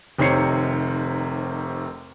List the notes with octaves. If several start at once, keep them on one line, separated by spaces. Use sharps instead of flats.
F1 C3 D#3 C#5 C7 C#7